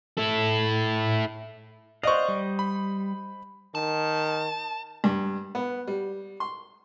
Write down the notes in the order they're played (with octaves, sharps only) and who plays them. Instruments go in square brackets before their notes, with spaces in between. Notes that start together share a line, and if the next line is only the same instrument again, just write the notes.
[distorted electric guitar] E4 A4
[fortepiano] C5 D#5 [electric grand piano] D5 C#6 [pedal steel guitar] F5 F#5
[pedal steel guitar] G3
[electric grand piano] B5
[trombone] D#3 [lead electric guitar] A5
[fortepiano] G2
B3
G3
C6